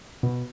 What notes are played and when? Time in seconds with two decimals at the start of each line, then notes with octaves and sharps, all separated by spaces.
0.23 B2